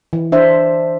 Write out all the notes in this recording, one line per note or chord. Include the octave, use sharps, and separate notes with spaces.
E3
D4 C5 E5